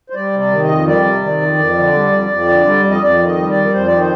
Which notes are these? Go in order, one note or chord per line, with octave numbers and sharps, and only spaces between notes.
C5
G3 D5
C3
D5
D#3
D#5
F2
G3 D5
C3
D#3
F2
F2
D3
G3
F2
F2
D3
G3
F2
D#5
F2 D5
D#3
D#5
G3
D5
F2
F2 C5
D#3 D5
C5